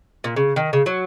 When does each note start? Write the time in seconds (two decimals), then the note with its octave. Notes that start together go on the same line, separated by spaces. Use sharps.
0.24 A#2
0.36 C#3
0.56 D#3
0.73 C#3
0.86 F#3